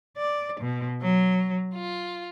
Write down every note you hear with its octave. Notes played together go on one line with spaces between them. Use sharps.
D5
B2
F#3
F4